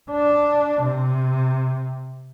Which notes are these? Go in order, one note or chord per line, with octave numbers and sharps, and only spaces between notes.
D4
C3